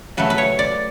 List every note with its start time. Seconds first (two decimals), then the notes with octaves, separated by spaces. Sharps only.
0.17 C#3 F#3 A3 B4
0.30 B4
0.38 C#5
0.59 D5